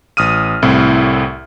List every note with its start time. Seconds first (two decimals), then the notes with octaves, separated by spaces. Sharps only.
0.17 A1 D#6 F6 D#7
0.62 C2 A2 C4 E4